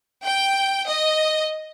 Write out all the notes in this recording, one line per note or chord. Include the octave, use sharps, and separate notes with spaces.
G5
D#5